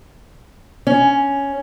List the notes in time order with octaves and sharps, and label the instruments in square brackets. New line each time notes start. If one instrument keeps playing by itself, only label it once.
[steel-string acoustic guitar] C#4